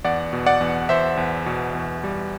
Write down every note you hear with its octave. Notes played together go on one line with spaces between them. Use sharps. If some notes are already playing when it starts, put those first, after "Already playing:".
E2 D5 F#5
B2
D5 F#5
E2
E2 C5 E5
E2
B2
E2
G3